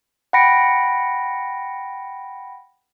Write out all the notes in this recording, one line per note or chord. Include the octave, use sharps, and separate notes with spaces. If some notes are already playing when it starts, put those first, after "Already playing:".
F#5 G5 B5 A#6 C#7 D7